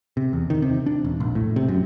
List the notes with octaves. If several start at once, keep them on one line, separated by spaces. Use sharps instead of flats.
C3
E2
D#3
C3
D4
E1
A#1
A2
C3
F#2